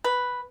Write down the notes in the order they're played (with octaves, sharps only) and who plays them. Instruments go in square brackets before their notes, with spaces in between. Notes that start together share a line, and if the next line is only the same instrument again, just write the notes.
[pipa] B4